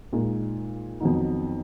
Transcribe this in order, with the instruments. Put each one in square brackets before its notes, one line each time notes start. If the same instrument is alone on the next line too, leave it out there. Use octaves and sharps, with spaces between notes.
[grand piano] A#2 G#3 D#4
F2 D#3 F#3 B3 D#4